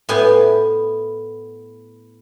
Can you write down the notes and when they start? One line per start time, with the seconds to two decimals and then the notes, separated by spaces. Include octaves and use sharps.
0.09 A2 B3 G4 G#5